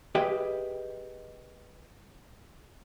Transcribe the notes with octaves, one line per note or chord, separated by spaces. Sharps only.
G4 G#4 B4 D#5 E5 G5